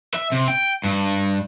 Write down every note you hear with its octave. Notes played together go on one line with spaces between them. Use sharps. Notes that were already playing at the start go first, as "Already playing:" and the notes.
E5
C3
G5
G2